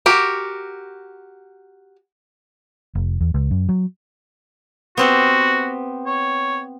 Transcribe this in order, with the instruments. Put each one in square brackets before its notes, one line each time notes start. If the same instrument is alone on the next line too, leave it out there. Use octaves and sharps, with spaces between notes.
[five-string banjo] F#4 G4 A#4
[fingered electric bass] F1
E2
C#2
F#2
F#3
[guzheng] B3 C4 G4 [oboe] F#4
[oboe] C#5